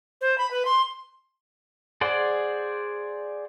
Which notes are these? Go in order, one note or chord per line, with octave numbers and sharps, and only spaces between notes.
C5
B5
B4
C6
G#4 C5 D5 F#5